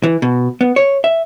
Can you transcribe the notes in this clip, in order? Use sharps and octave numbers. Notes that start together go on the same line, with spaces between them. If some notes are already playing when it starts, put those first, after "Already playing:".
E3
B2
B3
C#5
E5